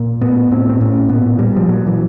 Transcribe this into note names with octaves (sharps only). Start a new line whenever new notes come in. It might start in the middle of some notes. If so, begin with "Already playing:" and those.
Already playing: A#2
A2 B3
A2 C4
C4
A2 C#4
A#2 B3
A#2 G3
F3
A#2 F#3
E3